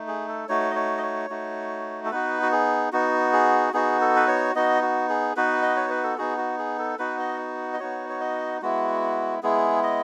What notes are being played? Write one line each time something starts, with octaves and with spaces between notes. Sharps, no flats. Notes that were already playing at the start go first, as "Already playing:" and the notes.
Already playing: A3 D#4
G#4
A4
A3 D#4 F#4 C#5
D#5
C#5
D#5
C#5
A3 D#4 F#4
A4
B3 D#4 F#4 B4
F#4
G#4
B3 D#4 F#4
G#4
B3 D#4 F#4 G#4
A4
B4
C#5
B3 D#4 F#4 D#5
F#4
G#4
B3 D#4 F#4 B4
D#5
C#5
B4
A4
B3 D#4 F#4 G#4
F#4
G#4
A4
B3 D#4 F#4 B4
D#5
D#5
B3 D#4 F#4 C#5
C#5
D#5
G#3 B3 E4 F#4
G#3 B3 E4 G#4
D#5